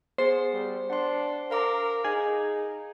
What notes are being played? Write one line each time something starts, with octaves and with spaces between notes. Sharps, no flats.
B3 G#4 C5
G3
D4 F#5 C6
A#4 F5 A#5 D6
D#4 G#4